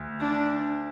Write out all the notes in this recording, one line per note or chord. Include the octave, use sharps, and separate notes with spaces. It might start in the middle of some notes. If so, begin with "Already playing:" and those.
Already playing: D2
D4